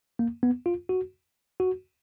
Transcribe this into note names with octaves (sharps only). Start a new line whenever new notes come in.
A#3
B3
F4
F#4
F#4